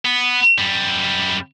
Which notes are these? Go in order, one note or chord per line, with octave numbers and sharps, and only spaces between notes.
B3
F#2 G3